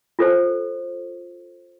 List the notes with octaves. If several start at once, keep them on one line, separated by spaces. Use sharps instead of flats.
F4 A4 C5